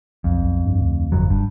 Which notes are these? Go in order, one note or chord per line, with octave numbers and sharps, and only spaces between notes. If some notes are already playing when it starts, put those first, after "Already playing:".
B1 F2
B1
G2
D2
G1 F2 F#3
F1 G2